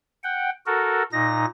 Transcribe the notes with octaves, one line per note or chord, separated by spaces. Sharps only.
F#5 G5
F#4 A4 A#4
A#2 D#4 A#6